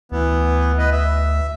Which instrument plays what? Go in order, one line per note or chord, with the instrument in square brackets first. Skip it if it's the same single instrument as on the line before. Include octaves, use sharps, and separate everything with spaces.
[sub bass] D2 [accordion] E3 B3
[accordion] B4 D#5
E5